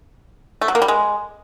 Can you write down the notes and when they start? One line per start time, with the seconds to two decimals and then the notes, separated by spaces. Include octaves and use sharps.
0.61 A3
0.68 F#3
0.75 A#3
0.82 G3
0.88 G#3